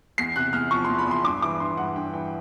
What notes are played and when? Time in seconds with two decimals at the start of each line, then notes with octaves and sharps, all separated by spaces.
0.18 E2 C7
0.36 C3 F#6
0.53 E2 F6
0.71 F3 C#6
0.85 E2 C6
0.99 B5
1.07 E2 C6
1.25 G2 D6
1.42 E3 D6
1.60 G2 C6
1.77 G2 F#5
1.96 G2 G5
2.13 E3 G5